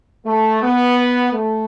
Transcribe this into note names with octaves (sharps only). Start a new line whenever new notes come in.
A3
B3
A3